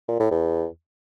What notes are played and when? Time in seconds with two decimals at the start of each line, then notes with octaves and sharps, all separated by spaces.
0.08 A#2
0.20 A2
0.31 E2